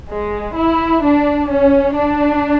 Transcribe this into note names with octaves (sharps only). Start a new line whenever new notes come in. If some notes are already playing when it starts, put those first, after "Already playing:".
G#3
E4
D4
C#4
D4